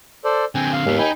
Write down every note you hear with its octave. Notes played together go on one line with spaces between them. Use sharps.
A4 C5 D5
D3 C4 G5 G#5
F5
D#2 G#2 B3
D#4 D#5 G5 G#5 B5